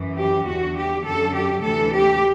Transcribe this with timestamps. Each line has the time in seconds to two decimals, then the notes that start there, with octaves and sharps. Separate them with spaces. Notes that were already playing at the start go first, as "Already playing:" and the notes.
Already playing: F#2 E3
0.17 G4
0.46 E2 D3 F#4
0.76 G4
1.05 F#2 D3 A4
1.34 G4
1.63 D2 C3 E3 A4
1.93 G4